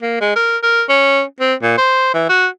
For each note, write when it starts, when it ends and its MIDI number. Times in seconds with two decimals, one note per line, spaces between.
0.02 0.17 58
0.21 0.31 56
0.36 0.58 70
0.63 0.83 70
0.89 1.22 61
1.40 1.54 60
1.62 1.75 46
1.78 2.10 72
2.14 2.27 52
2.29 2.47 66